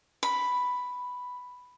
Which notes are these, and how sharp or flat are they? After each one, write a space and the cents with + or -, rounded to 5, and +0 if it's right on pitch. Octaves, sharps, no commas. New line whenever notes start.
B5 +5